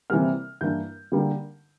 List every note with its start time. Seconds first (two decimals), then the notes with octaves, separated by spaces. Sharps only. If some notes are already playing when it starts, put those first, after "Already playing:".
0.10 C3 E3 G3 A#3 F6
0.61 G2 E3 A#3 D4 G6
1.12 D3 G3 A#3